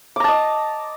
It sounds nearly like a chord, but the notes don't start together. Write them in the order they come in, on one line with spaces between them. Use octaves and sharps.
D6 A#5 A5 D#5